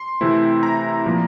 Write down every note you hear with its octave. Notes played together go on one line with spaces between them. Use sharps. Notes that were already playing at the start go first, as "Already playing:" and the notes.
Already playing: C6
C3 E3 A3 C4 E4
A#5
A#2 F3 A#3